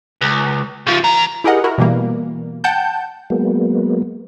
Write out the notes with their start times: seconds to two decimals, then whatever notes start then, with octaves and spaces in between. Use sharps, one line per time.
0.22 C#2
0.87 C#3 F3
1.04 E3 A#5
1.44 E4 G4 G#4 A#4 D#5 F#5
1.64 E4 F#4 A#4
1.78 B2 E3 G3 A#3
2.64 F#5 G5 A5 G6
3.30 F#3 G#3 A#3 B3